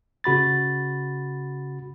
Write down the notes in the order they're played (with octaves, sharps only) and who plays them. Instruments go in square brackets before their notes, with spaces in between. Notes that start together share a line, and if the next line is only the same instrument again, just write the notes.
[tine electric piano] C#3 F#4 B5 A6